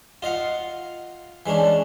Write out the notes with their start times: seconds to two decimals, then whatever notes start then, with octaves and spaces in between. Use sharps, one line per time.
0.22 F4 D#5 F5 F#5
1.46 E3 G#3 C#4 D4